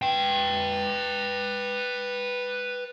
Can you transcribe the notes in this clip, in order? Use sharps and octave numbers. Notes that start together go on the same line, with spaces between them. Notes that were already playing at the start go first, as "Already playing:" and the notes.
B4 G5